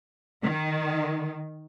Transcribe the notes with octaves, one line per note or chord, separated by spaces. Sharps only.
D#3